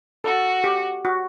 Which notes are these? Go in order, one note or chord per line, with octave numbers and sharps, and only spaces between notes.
F#4 A4
G4
F#4